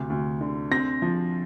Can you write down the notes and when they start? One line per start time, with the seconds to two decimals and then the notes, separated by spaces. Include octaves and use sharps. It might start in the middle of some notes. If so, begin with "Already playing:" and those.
Already playing: D2 C3
0.10 D2
0.41 D3
0.71 C4 A#6
1.02 F3